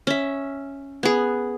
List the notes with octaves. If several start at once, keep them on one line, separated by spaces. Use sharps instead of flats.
C#4 E5
B3 G#4